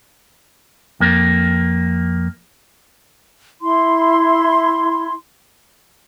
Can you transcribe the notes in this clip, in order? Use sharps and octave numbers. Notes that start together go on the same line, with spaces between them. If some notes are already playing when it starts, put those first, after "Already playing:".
F2 A#3
E4 C6